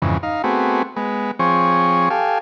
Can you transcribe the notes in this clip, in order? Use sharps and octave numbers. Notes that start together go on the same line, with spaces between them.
F2 G#2 C#3 E3
D#4 F5
A3 B3 C4 F#4 G#4
G#3 B3
F3 C4 G#4 C#5 C#6
G4 A4 F5 G#5